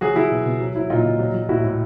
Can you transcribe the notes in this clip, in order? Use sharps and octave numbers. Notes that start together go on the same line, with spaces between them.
F#3 F#4 G#4
F#3 E4 F#4
B2
B2
F#3
F#3 E4
A#2 D#4 F4
A#2
F#3
F#3
A2 E4 F#4
A2